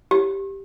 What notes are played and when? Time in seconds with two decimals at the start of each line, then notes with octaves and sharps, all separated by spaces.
0.11 G4